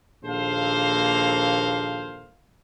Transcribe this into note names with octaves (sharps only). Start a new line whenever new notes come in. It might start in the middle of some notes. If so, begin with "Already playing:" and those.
A#1 D#2 A#3 A4 C5 F5